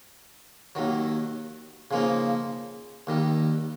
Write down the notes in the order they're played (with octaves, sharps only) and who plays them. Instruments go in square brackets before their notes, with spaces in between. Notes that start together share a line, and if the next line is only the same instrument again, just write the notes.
[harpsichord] D#2 D#3 F#3
C#3 F3 A#3 D#4
D#2 D#3 G3